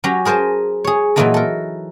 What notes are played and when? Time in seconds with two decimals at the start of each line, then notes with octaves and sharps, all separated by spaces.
0.04 F#3 C#4 G4 A#5
0.25 G#4 A#4 C5 G#5 A5
0.84 G#4 C#5
1.16 A#2 E3 F#3 A#3 D#4 A4
1.34 A4 A#4